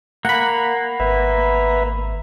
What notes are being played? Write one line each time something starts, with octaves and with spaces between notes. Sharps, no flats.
A#3 F#5 B5
G#1 B4 E5